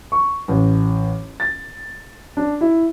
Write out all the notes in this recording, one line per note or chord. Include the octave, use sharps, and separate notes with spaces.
C#6
A1
A6
D4
E4